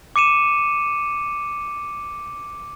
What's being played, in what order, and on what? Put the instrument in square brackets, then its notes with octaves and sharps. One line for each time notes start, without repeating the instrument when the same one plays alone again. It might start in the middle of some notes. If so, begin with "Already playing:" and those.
[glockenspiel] D6 C#7 D#7 E7